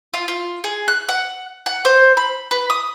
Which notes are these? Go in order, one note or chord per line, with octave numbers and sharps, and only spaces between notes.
F4
F4
G#4
F#6
F#5
F#5
C5
B5
B4
D#6